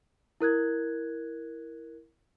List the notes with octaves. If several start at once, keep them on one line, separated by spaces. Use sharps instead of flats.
E4 A#4 F#6 G#6